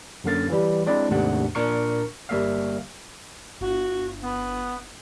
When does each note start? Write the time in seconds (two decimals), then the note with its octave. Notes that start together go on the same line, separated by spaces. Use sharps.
0.24 F#2 D3 A#3 F5 A6
0.50 E3 G3
0.86 G#3 C4 D4 E4 D5
1.09 D#2 G#2 C3 A3 D4 F#5
1.55 A#2 D4 A#4 C#6 C#7
2.29 G1 G3 A#3 E5 F5
3.61 G1 F#4
4.22 B3